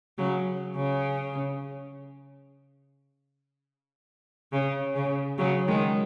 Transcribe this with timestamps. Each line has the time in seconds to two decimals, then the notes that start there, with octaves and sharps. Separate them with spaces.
0.18 C#3 F#3
0.76 C#3
4.52 C#3
4.95 C#3
5.38 C#3 F#3
5.67 D#3 G#3